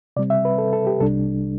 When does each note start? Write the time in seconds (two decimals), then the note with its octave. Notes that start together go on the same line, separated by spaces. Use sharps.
0.16 C3 G3 C4 D5
0.30 E5
0.45 B4
0.58 A4
0.73 A4
0.87 G4
1.00 C2 C3 G3 D4 A4